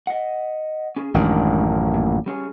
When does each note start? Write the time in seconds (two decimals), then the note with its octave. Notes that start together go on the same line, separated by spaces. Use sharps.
0.07 D#5 F#5
0.96 C#4 G#4
1.14 A1 F#2 D#3 F#3 G#3 D4
1.94 A#2
2.26 G3 C#4 G#4